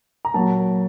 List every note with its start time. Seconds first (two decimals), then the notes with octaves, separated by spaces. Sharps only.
0.25 A#5
0.34 A#2 F#3 A#3 A5